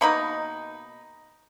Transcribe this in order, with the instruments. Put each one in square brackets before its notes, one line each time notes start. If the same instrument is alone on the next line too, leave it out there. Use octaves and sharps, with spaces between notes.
[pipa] B2 A#3 D#4 B5